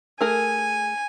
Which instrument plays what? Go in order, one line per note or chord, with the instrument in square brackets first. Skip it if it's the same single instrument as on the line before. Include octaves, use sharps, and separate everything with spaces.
[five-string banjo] A3 G#4 A#4 [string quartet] G#5